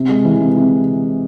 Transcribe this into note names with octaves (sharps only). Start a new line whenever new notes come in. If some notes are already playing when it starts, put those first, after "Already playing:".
Already playing: C3
G#3
E3
C3
C3